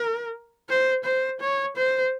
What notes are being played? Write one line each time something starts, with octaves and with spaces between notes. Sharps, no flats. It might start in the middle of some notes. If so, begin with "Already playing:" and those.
Already playing: A#4
C5
C5
C#5
C5